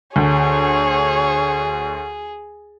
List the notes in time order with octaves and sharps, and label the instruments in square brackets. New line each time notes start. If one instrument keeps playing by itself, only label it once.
[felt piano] D2 [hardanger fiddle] G#4 [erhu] C#5